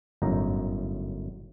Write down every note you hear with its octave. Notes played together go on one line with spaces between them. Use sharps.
G1 F#2 A2 D#4 A#5